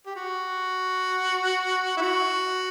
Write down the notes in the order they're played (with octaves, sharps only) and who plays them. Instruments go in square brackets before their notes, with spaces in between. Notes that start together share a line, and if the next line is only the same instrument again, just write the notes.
[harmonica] G4
F#4
E4
F#4